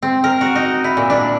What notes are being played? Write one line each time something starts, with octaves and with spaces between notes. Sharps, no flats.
C4
A#4
F#4
D#4
E4
A#2
D4